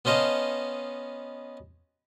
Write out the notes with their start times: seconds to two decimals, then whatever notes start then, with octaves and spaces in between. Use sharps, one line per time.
0.05 B3 C#4 C5 D#5 F5 A5